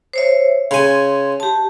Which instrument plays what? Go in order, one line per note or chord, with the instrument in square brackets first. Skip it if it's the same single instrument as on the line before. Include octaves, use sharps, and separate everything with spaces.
[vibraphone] C5 C#5 E5
[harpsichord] C#3 G#5 [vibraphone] C6
[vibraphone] G4 A5